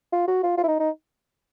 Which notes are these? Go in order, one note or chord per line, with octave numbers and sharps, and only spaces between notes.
F4
F#4
F4
F4
E4
D#4
D#4